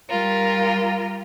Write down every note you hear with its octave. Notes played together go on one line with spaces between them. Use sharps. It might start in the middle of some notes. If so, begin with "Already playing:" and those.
G3 F4 A#4